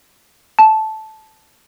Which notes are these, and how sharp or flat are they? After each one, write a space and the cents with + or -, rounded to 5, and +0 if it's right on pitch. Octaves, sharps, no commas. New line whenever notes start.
A5 -10